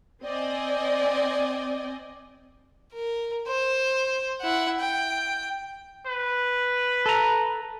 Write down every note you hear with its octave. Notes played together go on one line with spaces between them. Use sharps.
C4 D5 D#5 G#5
A#4
C5
E4 F#5
G5
B4
A4 A#5